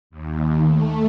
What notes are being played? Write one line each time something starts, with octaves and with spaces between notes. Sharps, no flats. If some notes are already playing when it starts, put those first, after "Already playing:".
D#2
A3